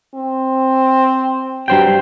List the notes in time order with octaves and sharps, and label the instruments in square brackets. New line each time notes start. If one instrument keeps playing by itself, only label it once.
[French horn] C4
[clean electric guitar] G2 C5 G5 [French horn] F#3